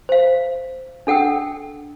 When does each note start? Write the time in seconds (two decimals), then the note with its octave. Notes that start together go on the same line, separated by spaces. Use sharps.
0.09 C5 F5
1.07 D4 A4 F#5 G5 E6